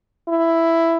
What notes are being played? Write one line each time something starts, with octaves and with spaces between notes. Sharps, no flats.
E4